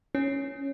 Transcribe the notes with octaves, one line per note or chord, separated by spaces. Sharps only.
C#4